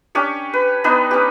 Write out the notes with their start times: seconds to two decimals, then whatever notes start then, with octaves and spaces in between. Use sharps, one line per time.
0.15 C#4 D4 G4 C#5
0.54 B4
0.84 B3 D4 D#4 B4
1.11 C#4 G4